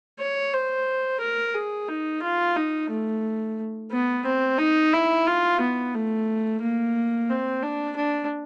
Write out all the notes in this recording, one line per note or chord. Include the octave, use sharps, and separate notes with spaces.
C#5
C5
A#4
G#4
D#4
F4
D#4
A3
B3
C4
D#4
E4
F4
B3
A3
A#3
C4
D4
D4